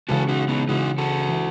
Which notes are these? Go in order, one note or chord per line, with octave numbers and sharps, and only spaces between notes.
C#3 E3 G#3 F#4 A4
D#4 F#4
B3 D#4
C#3 E3 G#3 D#4 F#4
F#4 A4
E3